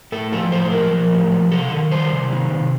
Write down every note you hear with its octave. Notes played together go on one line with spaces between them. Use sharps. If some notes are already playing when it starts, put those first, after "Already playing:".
A2 A4
F3 A4
A2 C5
F3 A#4
F3
A2
F3
C3 A4
D#3
G3 C5
C3
D#3
C3